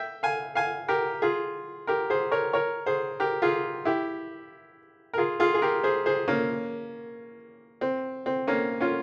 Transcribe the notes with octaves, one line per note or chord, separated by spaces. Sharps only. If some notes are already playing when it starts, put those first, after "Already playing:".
Already playing: E5 G5
F5 G#5
F5 G#5
G4 A#4
F4 G#4
G4 A#4
G#4 C5
A#4 C#5
A#4 C#5
G#4 C5
G4 A#4
F4 G#4
E4 G4
A#4
F4 G#4
F4 G#4
G#4
G4 A#4
G#4 C5
G#4 C5
A#3 C#4
C4
C4
A#3 C#4
C#4 F4